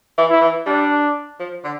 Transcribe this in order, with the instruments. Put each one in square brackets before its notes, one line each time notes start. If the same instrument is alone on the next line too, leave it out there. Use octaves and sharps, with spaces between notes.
[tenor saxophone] E3
[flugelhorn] E4
[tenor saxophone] E3
[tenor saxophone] G3 [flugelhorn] D4
[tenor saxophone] F3
D3